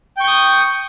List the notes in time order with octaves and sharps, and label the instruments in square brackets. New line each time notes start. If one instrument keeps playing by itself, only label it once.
[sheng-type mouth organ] G5
C#6
G6
D#6